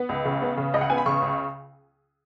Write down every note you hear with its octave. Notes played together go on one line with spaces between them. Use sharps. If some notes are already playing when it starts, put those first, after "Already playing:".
Already playing: B3
C#2
C#3
B3
C#3
C#2 D#5
F#5
B3 G#5
B5
C#3 C#6
C#2